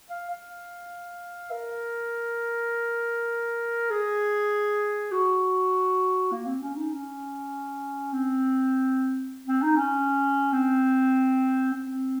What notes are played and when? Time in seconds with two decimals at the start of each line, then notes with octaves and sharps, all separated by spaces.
0.10 F5
0.31 F5
1.51 A#4
3.91 G#4
5.12 F#4
6.32 A#3
6.46 C4
6.61 C#4
6.76 D#4
6.92 C#4
8.13 C4
9.47 C4
9.62 D#4
9.77 C#4
10.52 C4
11.73 C4